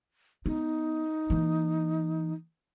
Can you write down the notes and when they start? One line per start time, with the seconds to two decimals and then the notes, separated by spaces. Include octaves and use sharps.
0.46 B3 D#4
1.30 E3 A#3